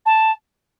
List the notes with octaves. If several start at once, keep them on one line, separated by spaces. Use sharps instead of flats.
A5